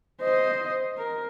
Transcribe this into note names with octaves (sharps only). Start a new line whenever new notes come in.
C5 D#5
A#4